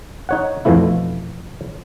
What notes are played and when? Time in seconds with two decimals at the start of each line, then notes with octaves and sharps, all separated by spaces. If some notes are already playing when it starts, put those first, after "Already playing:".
0.29 D#4 C#5 F#5
0.65 F2 B2 E3 F3 A3 E4